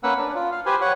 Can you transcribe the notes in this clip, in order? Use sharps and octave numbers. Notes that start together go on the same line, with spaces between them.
A#3 C#4 B4 F#5 E6
D4
F4
F5
G4 B4 C5 G#5
C#5 F#5